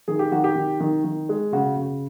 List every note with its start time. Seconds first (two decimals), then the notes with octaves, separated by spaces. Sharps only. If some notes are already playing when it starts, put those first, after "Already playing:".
0.08 D#3 G#4
0.19 G4
0.32 D#3 F#4
0.44 G4
0.55 D#3
0.80 D#3
1.04 D#3
1.29 G#3
1.52 C#3 F#4
1.77 C#3